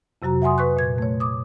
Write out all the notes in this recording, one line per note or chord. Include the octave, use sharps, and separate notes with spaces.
F2 C3 F#3 F#4 A#5
E5 F#5 G#5 C6 D#6
B4 C#6 F#6
A#2 G#6
A3 C#5
D6 D#6